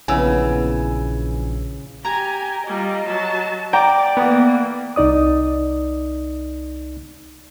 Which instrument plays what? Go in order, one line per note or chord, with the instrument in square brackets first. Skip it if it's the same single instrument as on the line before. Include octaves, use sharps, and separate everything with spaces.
[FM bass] A#1 [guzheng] C#3 [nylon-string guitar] E3 B3 E4 [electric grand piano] G#5 E6
[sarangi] G4 [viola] G#5 [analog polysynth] A#5
[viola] G3 F4 [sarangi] D#5
[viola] F#3 A5
[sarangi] D5 [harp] G5 A#5 [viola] D6
[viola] E3 A#3 [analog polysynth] B3
[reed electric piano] C2 D#4 D5 D#6